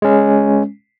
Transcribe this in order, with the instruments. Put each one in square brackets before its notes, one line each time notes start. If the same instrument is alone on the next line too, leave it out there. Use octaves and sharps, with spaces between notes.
[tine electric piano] G#3 C#4